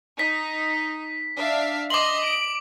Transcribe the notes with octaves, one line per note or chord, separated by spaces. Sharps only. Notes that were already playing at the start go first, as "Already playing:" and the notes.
D#4 B6
D4 E5 F5
D#5 C6 D6 F#7
D7